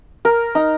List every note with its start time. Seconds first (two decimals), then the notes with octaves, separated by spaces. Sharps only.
0.25 A#4
0.55 D#4